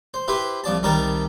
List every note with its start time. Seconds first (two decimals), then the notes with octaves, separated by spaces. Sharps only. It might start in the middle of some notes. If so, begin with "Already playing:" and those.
0.14 C5
0.28 E4 G4 B4 C5
0.64 C2 F3 D5 A5
0.83 C2 D#3 G3 A#4 A5